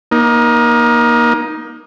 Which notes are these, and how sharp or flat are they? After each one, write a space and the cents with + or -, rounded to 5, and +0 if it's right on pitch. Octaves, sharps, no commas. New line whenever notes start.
A#3 +25 D#4 +0